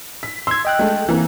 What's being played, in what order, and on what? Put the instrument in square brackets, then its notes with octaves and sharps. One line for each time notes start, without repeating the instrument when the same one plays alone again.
[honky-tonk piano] B6
[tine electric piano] C6 G#6 [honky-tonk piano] E6
[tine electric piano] D#5 G5 F#6
[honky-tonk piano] G#3 A3
E3 A#3 C4